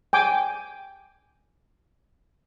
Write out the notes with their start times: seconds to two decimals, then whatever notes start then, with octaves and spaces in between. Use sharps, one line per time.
0.13 G5 G#5 D6